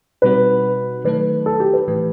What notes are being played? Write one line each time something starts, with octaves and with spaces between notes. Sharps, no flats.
B2 G3 C4 D#4 F#4 B4
D#3 F#3 A3 D#4 A4 B4
A4
G4
B4
A2 E3 A3